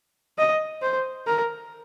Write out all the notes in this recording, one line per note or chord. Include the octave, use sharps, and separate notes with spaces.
D#5
C5
A#4